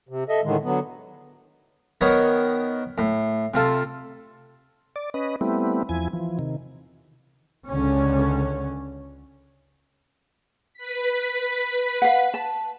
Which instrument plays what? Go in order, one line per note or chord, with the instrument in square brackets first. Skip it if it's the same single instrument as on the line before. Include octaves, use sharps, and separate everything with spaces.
[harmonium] C3
A4 D#5 E5
A2 D3 D#3 G#3
D3 F#3 B3
[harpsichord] D#3 B3 D#4 C#5
A2
C3 F4 A4
[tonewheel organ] D5
C#4 B4 D#5
G3 A3 B3 C4 E4
E2 F3 E4 G#5
E3 F3
C3 D#3
[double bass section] C#2 D3 C#4
[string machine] B4 B6
[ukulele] F5 F#5
A5